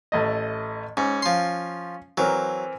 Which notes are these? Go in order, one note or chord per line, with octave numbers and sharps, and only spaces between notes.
A1 A3 D#5
G#2 C#4
F3 C6
E3 F#3 C4 A#4